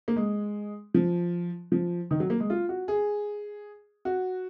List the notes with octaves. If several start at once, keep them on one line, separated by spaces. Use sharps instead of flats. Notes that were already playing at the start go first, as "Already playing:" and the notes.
A#3
G#3
F3
F3
D#3
F#3
A#3
G#3
F4
F#4
G#4
F#4